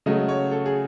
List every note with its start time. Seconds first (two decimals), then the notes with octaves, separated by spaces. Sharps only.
0.06 C#3 F#3 A3 D#5
0.29 C#5
0.51 A4
0.66 G#4